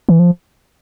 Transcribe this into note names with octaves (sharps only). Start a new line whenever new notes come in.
E3
F3